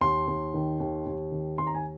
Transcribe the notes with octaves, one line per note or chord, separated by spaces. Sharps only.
D#2 C6
D#2
D#3
D#2
D#2
D#3
D#2 C6
A#5
G#5